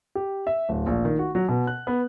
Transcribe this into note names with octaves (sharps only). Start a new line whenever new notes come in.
G4
E5
D1
A#1
D#3
F#4
F#3
B2
F#6
B3